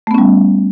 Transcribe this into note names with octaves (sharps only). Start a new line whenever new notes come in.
G3 A3 B3 C#4